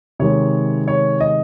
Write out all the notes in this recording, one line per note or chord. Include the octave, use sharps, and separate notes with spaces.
C3 D#3 G#3 C#5
C#5
D#5